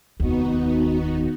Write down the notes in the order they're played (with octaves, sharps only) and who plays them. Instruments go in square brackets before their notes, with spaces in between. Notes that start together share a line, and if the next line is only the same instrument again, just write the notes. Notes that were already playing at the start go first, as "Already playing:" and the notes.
[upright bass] F1 D#2 [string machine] B3 D#4 F#4